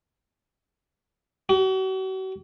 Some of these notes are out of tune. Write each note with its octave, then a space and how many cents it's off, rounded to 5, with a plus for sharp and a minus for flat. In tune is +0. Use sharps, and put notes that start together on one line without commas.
F#4 +40